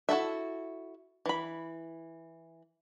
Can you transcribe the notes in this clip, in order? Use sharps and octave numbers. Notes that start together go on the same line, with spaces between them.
E4 F#4 A4 E5
E3 B5